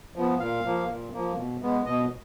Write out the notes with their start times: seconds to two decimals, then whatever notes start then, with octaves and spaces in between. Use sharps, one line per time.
0.16 F3 B3
0.40 A#2 F5
0.65 F3 A#3
0.89 A#2
1.13 F3 A#3
1.37 B2
1.62 G#3 B3
1.85 B2 D#5